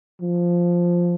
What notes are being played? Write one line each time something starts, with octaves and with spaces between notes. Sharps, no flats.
F3